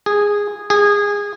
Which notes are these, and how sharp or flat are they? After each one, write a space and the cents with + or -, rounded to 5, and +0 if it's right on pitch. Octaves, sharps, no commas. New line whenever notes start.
G#4 -10
G#4 -20